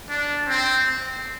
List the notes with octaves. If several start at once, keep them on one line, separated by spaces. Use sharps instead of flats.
D4
C4